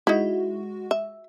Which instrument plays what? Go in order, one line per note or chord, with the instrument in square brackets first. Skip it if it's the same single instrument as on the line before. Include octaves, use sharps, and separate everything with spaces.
[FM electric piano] G#3 F#4 [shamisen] D#4 E4
[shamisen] E5